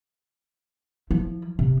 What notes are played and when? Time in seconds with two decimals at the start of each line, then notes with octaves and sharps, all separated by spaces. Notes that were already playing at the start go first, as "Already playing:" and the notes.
1.11 F3 E4
1.59 C3